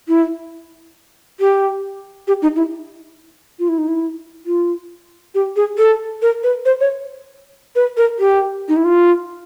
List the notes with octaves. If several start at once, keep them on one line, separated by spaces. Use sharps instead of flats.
E4
G4
G4
D#4
E4
F4
E4
D#4
E4
F4
G4
G#4
A4
A#4
B4
C5
C#5
B4
A#4
G4
D#4
E4
F4